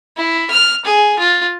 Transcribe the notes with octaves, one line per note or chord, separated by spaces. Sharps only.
E4
F6
G#4
F4